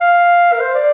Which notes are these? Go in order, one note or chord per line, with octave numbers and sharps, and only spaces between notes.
F5
A#4
C5
D5